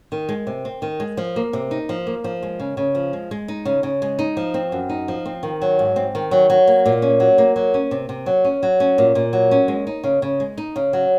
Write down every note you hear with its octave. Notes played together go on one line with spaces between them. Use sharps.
D#3
G#3
C3
C4
D#3
G#3
F3
A#3
C3
D#4
F3
A#3
F3
G#3
C#3
C#3
F3
G#3
G#3
D#4
C#3
C#3
G#3
D#4
F3
C4
F#2
D#4
F3
C4
D#3
F#3
G#2
C4
D#3
F#3
F#3
A#3
A#2
C#4
F#3
A#3
F#3
C#4
C3
C3
F#3
C#4
F#3
C#4
A#2
A#2
F#3
C#4
G#3
D#4
C#3
C#3
G#3
D#4
C#3
F#3